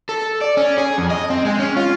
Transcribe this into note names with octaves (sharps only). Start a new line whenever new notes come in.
A4
D5
C#4
G#4
F2
D#5
C4
G#3
C#4
F4